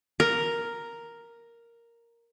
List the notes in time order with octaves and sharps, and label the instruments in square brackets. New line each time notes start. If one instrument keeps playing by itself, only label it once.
[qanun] A#4